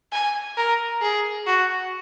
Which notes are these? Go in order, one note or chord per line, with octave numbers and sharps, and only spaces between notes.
G#5
A#4
G#4
F#4